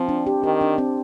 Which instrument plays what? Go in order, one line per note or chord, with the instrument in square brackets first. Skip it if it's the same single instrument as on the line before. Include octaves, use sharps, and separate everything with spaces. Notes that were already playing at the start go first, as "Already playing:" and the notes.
Already playing: [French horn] F3 [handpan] C4
[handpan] D4
G4
[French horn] D#3 [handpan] G4
[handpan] D4
C4